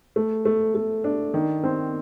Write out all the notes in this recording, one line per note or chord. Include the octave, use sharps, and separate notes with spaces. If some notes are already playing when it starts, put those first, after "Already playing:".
A3
A3
A3
D4
D#3
C4